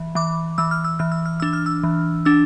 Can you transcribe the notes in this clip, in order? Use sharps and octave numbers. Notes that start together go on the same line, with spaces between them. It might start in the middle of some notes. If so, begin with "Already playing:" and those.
Already playing: E3
E3 D6
E3 E6
F6
E6
E3 F6
E6
F6
D4 E6
F6
E6
E3
D4 E6